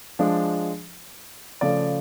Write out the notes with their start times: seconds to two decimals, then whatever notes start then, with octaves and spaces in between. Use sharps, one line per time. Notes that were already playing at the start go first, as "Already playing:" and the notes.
0.19 F3 G#3 D4
1.61 C#3 F3 A3 D5